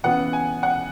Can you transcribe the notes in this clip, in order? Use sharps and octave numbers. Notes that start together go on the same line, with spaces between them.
C#3 E3 B3 F#5
G#5
F#5